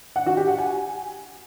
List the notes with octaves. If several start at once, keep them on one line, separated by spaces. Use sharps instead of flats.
F#5
F#4
G4
F#5
G#5